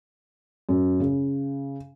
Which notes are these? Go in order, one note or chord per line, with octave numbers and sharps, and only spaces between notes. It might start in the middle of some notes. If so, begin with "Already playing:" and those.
F#2
C#3